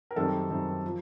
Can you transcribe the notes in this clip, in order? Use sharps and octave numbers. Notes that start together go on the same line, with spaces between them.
A#4
F#2 D#3 G3 C4 D#4 A4
F#2 D#3 G3 C4 D#4
F3